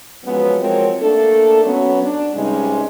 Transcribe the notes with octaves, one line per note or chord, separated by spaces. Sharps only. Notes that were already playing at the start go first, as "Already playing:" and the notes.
F3 F#3 G#3 B3 C#4
F3 F#3 G#3 C4 A#4 C#5
A3 A#3 D4 A4
F#3 B3 C#4
D4
G2 C3 G3 G#3 C#4 D#4